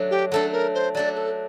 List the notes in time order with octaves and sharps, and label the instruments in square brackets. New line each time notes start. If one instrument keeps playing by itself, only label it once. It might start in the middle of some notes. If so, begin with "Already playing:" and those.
Already playing: [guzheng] F#3 A3 D4
[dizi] G4
[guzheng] F#3 A3 D4 [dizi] A4
[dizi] A#4
C5
[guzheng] F#3 A3 D4 [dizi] D5
[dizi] A4